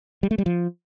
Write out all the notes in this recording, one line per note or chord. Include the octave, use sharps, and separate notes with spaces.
G3
A3
G3
F3